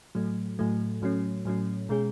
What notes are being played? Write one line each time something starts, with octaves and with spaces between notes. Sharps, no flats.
A2 F#3 A3
A2 F#3 A3
A2 F#3 A3 C#4
A2 F#3 A3 C#4
B2 G#3 C#4 G#4